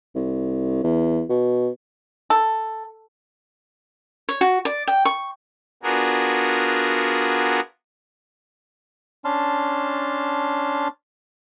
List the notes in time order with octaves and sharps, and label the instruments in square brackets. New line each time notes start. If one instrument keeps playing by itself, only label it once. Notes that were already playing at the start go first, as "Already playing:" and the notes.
[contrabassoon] C2
E2
B2
[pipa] A4
[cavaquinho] C#5
F#4
D5
G5
C#6
[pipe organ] B3 D4 F4 F#4 G#4 A#4
[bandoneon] C#4 D4 A5 C6 F6